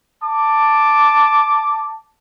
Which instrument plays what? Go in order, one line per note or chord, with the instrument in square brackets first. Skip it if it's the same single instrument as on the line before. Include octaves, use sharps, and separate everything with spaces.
[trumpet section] A5 D6